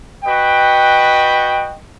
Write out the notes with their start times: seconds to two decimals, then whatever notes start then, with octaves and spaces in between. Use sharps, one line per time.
0.24 F#4 B4 D#5 G5